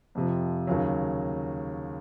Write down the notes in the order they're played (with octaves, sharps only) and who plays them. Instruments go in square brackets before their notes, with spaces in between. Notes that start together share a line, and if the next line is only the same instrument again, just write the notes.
[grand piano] F2 C3 F3
D#2 C#3 F#3